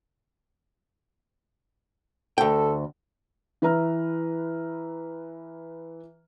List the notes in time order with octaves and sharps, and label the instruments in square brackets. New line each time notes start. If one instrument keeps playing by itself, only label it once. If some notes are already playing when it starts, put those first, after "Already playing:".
[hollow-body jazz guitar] D2 G5 [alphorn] A4
[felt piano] E3 B4 E5 A#5 F6